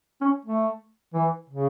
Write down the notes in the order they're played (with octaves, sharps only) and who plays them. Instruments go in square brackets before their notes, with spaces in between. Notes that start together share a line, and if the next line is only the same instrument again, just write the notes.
[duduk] C#4
A3
E3
C#3